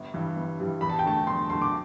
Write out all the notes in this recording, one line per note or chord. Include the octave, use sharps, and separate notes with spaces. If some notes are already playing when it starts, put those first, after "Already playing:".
Already playing: G1
G2 E3 G3
G1
G2 E3 G3
E2 B5
A5
G5
D3 A3 A5
E2 C6
D3 A3 C6
D6